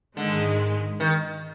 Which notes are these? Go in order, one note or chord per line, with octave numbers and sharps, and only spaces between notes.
G#2 D3 D#3 G#3
D#3